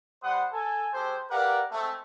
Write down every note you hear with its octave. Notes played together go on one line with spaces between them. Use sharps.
G3 B4 C5 F#5 C6 D#6
A4 G#5
G#3 G4 A4 C5
G4 A#4 B4 D5 F5 F#5
G#3 A3 C4